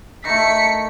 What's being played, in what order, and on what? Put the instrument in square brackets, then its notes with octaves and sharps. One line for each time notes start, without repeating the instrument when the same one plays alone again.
[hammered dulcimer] D#3 A3 [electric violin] B6 C#7